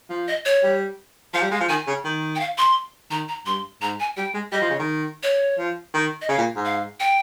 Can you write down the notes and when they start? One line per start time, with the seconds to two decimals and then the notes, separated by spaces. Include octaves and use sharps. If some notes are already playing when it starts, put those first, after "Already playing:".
0.10 F3
0.28 D#5
0.45 C#5
0.63 G3
1.34 F3 F5
1.42 G3
1.51 G#3 F5
1.60 F3
1.69 D#3 G#5
1.87 C#3
2.05 D#3
2.36 G5
2.40 F5
2.58 C6
3.11 D#3 A#5
3.29 A#5
3.46 G2 C6
3.82 G#2 A#5
4.00 G#5
4.17 G3 G5
4.34 G#3
4.52 G3 D#5
4.62 F3
4.70 C#3
4.79 D#3
5.23 C#5
5.58 F3
5.94 D#3
6.22 D#5
6.29 C#3 F5
6.38 A#2
6.56 G#2
6.65 F5
7.00 G5